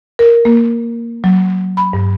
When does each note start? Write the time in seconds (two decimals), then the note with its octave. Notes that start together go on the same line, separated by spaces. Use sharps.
0.19 A#4
0.45 A#3
1.24 F#3
1.77 B5
1.93 G2